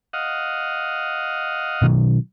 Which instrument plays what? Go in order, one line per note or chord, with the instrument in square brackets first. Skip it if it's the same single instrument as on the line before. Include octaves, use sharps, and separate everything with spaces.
[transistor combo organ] D#5 F5 F#5
[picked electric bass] B2 D#3 F#3